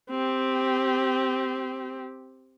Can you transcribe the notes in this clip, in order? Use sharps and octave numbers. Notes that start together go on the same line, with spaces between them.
C4 G4